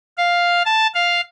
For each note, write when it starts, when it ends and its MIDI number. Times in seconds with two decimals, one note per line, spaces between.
0.18 0.63 77
0.65 0.87 81
0.95 1.21 77